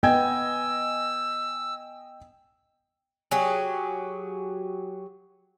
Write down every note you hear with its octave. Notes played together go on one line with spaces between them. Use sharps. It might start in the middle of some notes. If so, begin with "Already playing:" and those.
B3 D#5 G5 G#5 E6 G#6
F#3 G4 G#4